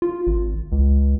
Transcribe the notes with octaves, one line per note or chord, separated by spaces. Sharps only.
F4
G#1
C#2